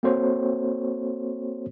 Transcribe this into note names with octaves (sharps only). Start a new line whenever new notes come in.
A#3 C4 F#4 A4 C5 C#5